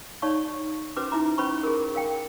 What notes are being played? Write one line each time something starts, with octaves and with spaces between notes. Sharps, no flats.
D#4 C#5 D5 F5 A5 C#6
C#4 F#4 B4 C5 D6
D#4 E4 E5 A#5 D6
C#4 B4 C5 B5 C#6
G#4 A#4
A#4 F5 G5